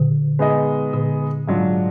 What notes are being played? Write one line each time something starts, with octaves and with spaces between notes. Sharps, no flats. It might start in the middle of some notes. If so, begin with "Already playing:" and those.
Already playing: A#2 D3
G#3 B3 D#4 G#4 D#5
A#2 D3
G#2 F#3 D4 F4